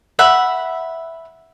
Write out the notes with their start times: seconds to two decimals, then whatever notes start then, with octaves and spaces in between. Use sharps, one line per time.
0.19 E5 F#5 B5